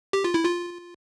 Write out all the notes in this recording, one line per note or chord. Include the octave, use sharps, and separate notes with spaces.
G4
F4
E4
F4